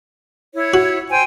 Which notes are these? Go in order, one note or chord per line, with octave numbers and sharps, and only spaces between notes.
E4 C#5
F#4
C5 G5 G#5